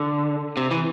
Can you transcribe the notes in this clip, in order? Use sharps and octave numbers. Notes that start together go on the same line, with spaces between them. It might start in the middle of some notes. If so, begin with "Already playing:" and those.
Already playing: D3
C3
E3